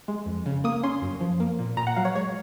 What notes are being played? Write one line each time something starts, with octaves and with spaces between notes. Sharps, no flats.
G#3
F2
C#3
A#3 D#6
C#4 C6
F#2
F3
A#3
A#2
A#2 A#5
F#5
F#3 F5
C#5
G#3 C#5